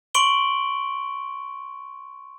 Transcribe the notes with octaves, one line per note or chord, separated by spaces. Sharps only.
C6 C#6 D7 F#7 G7